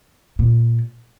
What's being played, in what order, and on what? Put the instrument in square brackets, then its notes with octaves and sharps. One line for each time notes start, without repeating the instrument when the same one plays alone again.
[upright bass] A#2